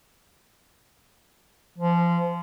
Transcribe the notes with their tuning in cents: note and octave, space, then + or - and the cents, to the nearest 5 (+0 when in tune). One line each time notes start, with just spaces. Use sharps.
F3 -25